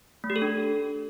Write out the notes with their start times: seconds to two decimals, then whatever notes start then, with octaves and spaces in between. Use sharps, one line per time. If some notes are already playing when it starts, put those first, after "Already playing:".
0.24 A3
0.30 G4
0.36 A4
0.42 D4